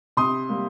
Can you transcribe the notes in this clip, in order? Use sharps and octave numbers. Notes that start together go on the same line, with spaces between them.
C3 C6 D#6
G3 A#3